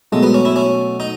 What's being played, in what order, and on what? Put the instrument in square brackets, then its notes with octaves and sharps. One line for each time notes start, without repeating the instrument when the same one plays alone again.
[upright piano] B2 F#3 A3 [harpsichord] G#3
[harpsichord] B3
C#4
E4
C#4
D#4